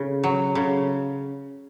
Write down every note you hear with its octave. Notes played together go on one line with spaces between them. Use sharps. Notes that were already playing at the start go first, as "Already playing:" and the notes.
Already playing: C#3
F#3
C#3